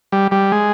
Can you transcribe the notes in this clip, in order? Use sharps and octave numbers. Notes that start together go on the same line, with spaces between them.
G3
G3
G#3